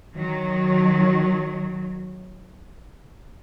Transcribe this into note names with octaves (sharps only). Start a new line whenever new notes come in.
D#3 F#3